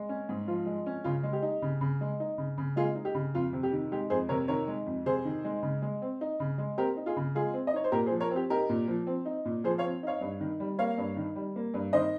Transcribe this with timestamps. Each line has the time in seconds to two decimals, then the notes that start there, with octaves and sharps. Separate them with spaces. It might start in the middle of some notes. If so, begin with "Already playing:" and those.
Already playing: G#3
0.09 C#4
0.29 G#2
0.47 F3 F4
0.66 G#3
0.86 C#4
1.04 C#3 F4
1.23 G#3
1.33 G4
1.42 D#4
1.62 C#3
1.81 C#3
2.01 G#3
2.20 D#4
2.38 C#3
2.58 C#3
2.76 G#3 F4 G#4
2.95 D#4
3.05 G4
3.15 C#3
3.35 F2 F4
3.53 C3
3.63 G4
3.72 D#3
3.92 G#3 G4
4.10 F2 G#4 C5
4.29 C3 A#4 C#5
4.48 D#3 A#4 C#5
4.68 G#3
4.86 F2
5.06 C3 G#4 C5
5.25 D#3
5.45 G#3
5.63 C#3
5.82 G#3
6.02 C4
6.21 D#4
6.40 C#3
6.58 G#3
6.78 C4 G4 A#4
6.97 D#4
7.06 F4 G#4
7.17 C#3
7.35 G#3 F4 G#4
7.54 C4
7.67 D#5
7.73 D#4 C#5
7.84 C5
7.92 A#2 G4 A#4
8.06 G#4 C5
8.11 F3
8.20 A#4 C#5
8.31 C4
8.36 G4
8.50 D#4 G4 A#4
8.69 A#2
8.88 F3
9.07 C4
9.25 D#4
9.45 A#2
9.64 F3 G#4 C5
9.78 C#5 F5
9.83 C4
10.03 D#4 C#5 F5
10.21 G2
10.40 D#3
10.60 G3
10.79 A#3 C#5 F5
10.98 G2
11.16 D#3
11.36 G3
11.56 A#3
11.74 G2
11.93 D#3 C5 D#5